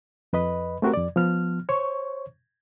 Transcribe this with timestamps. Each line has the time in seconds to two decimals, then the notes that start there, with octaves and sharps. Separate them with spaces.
0.33 F2 B4 D#5 B5
0.82 A3 C4 F#4 G4 A#4
0.94 F2 D5
1.16 F3 B3 F6
1.69 C5 C#5 C#6